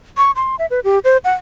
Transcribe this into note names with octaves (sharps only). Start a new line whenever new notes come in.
C#6
C6
E5
B4
G4
C5
F#5